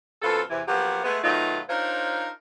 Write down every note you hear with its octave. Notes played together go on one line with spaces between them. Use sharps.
F#2 B2 C4 F4 A4
E2 C3 E3
F3 F#3 A#3 B3 F#4 G4
G#3 A3 B3
B2 D#3 F#3 A3 D#4 F4
D4 D#4 F4 A#4 C5 C#5